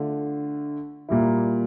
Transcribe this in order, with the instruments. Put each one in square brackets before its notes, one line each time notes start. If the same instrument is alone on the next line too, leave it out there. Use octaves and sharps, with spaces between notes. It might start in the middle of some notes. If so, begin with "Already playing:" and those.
Already playing: [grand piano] D3 A3 D4 F4
A#2 G3 A#3 E4